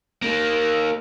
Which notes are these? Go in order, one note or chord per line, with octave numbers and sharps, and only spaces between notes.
D#3 A#3